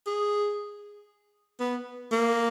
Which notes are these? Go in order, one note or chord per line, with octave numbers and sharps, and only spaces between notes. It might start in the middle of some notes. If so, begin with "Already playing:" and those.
G#4
B3
A#3